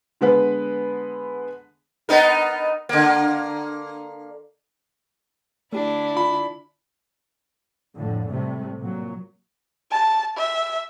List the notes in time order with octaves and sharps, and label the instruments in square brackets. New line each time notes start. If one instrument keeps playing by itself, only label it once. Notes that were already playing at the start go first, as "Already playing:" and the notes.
[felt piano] D3 G#3 B3 B4
[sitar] B3 D#4 A#4
D3 A#3
[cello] D3 E4 [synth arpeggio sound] A3 G4 [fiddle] D4
[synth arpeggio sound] F4 [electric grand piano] B5
[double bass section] F2 A2 D3
A2 C3 G3 A3
A#2 F#3
[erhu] A5
E5